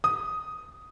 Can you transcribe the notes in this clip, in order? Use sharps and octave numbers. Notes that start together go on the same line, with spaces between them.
D#6